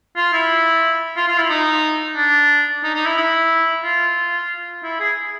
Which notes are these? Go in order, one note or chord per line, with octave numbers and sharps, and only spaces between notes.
F4
E4
F4
F4
E4
D#4
D4
D#4
D#4
E4
E4
F4
E4
G#4